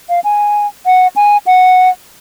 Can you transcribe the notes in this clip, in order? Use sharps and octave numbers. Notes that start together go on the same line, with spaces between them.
F5
G#5
F#5
G#5
F#5